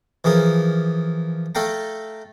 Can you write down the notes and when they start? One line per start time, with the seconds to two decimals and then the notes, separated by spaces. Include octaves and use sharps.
0.24 E3 F3 G#4 A#4
1.55 A3 A4 F5 G5 A#5